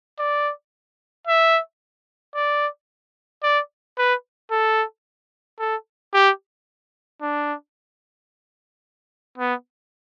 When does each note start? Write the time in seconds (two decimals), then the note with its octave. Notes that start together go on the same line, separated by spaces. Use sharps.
0.19 D5
1.27 E5
2.35 D5
3.43 D5
3.98 B4
4.51 A4
5.59 A4
6.14 G4
7.21 D4
9.38 B3